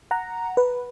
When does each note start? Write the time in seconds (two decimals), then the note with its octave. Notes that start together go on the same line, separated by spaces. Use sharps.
0.11 F#5 A#5
0.57 B4